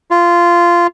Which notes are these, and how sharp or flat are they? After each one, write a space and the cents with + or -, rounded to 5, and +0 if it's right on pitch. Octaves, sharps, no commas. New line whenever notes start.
F4 -15